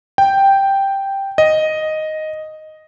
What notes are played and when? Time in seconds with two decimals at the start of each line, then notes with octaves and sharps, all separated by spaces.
0.18 G5
1.38 D#5